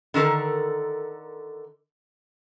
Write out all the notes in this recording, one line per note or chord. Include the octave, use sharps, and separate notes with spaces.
D3 D#3 A4 A#4